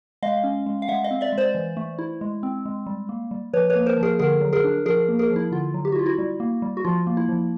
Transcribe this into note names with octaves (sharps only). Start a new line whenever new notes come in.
G#3 D#5 F5
C#4
G#3
F5
G#3 E5 F#5
D#5 F5
C4
D5 E5
G#3
C5 D5
E3
A3
E4
G#3
C4
G#3
G3
A#3
G3
F3 B4 C#5
B4 C#5
A#3
A#4 C5
F3
G#4 A#4
D3 G#4 A#4
F#3
G#4 A#4
D4
F3 G#4 A#4
A#3
G#4 A#4
F3
E4
D3 F4
F#3
G4
F#4
E4
F4
E4 F#4
G3
A#3
G3
F#4
F3 F4
A#3
E4
F3